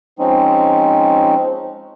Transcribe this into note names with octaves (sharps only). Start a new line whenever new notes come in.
F3 G#3 C4 C#4 D#4